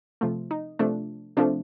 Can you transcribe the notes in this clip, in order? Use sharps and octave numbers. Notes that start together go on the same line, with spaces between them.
C3 F3 A3 F4
D#4
C3 F3 A3 D4
C3 F3 A3 D4